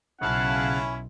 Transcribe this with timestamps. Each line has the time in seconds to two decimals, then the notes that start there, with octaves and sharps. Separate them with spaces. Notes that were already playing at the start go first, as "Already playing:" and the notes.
0.21 B1 C#3 C#4 E4 F5 F#5 A5